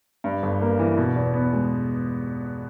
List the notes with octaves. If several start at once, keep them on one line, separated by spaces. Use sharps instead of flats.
G2
G1
A#3
E3
B2
E2
B3
G#3